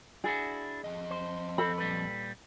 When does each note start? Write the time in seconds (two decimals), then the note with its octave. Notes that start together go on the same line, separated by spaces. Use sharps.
0.24 D4 E4 F#4 G#4
0.84 F2 D#5
1.11 C5
1.58 C4 A4 B5
1.78 A#2 G3 B4